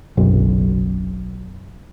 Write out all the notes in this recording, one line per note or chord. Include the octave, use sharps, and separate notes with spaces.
F#1 B1